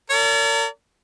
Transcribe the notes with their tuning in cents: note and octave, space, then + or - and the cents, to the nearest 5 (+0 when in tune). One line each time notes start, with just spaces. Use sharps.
A#4 -40 D5 -45